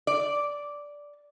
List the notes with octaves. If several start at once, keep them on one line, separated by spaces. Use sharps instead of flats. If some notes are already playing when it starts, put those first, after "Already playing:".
D5